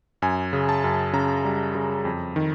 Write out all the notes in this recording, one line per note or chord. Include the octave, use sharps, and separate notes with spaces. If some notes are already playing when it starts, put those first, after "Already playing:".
F#2 G#5
C#3
A5
F#2
C#3 A#5
G3
C#3
F2
D#3